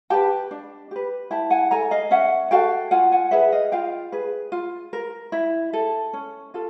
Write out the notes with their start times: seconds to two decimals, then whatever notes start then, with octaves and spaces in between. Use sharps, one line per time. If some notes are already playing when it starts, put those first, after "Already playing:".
0.10 G4 B4 G5 A5
0.51 D4
0.91 G4 B4
1.31 E4 G5 A5
1.50 F#5 G#5
1.71 A4 G#5 A#5
1.91 D#5 F5
2.11 C#4 E5 F#5
2.51 F#4 A4 F5 G5
2.91 F4 F#5 G#5
3.11 F#5 G#5
3.31 G#4 B4 E5 F#5
3.52 D#5 F5
3.72 F4 F5 G5
4.12 G#4 B4
4.52 F4
4.93 A#4
5.32 E4
5.73 A4
6.13 C#4
6.54 F4 A4